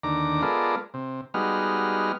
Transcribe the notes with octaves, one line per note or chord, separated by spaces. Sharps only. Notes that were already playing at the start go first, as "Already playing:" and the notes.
D#2 D3 A#5 D6
G#3 B3 F4 A4 A#4 D5
C3
G3 G#3 B3 D#4 F#4 F6